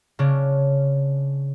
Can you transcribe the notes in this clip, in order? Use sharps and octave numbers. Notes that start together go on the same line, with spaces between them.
C#3 C#4 D4